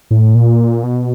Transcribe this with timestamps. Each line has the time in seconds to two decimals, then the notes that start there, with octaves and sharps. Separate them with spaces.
0.11 A2
0.35 A#2
0.83 B2